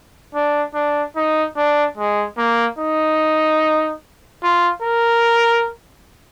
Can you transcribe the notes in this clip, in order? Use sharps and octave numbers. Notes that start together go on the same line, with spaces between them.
D4
D4
D#4
D4
G#3
A#3
D#4
F4
A#4